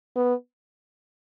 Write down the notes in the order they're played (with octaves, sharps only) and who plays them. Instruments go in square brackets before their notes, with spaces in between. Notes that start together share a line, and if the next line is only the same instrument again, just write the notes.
[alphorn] B3